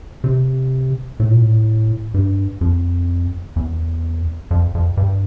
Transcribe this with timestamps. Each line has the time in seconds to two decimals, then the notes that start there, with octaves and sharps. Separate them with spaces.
0.24 C3
1.20 A2
1.31 A#2
1.42 A2
2.14 G2
2.61 F2
3.56 E2
4.51 F2
4.75 F2
4.97 G2